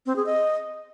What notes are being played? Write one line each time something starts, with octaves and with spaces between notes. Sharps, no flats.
C4
G#4
D#5